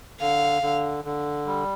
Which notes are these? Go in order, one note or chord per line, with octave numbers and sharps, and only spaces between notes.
D3 F5
D3
D3
G3